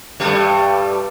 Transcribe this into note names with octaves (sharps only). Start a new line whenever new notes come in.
G2 G3 A3